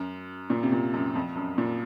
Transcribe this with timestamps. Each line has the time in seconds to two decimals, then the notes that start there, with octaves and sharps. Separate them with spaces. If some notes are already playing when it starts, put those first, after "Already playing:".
Already playing: F#2
0.50 A#2
0.63 C3
0.72 A#2
0.94 F#2
1.15 F2
1.36 F#2
1.58 A#2